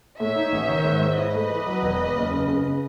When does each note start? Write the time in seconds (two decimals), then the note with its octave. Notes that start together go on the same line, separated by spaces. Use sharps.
0.20 A2 C#5 E5
0.36 D#4
0.52 A1
0.68 D#3
0.84 G#2
1.02 G#2
1.18 E4 B4 D#5
1.34 A3
1.50 E3
1.66 F#3
1.82 E1
1.99 E2
2.15 F#1
2.31 C#3
2.48 C#3
2.64 C#3